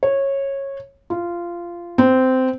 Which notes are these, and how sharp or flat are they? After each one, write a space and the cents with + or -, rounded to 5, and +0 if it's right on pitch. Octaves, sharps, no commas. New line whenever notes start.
C#5 -15
F4 -15
C4 -15